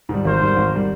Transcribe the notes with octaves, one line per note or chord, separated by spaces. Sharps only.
G#2 D#3 G3
G#1 A#4 C5
G#2 D#3 G3
G#1
D#3 G3